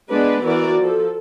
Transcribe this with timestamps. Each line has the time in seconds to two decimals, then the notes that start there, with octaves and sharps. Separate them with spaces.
0.10 G#3 B3 D4 B4 D5
0.45 E3 F#4 A#4 D5
0.79 F3 A4